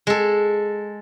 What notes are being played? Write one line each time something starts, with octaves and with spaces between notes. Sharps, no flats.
G#3 A4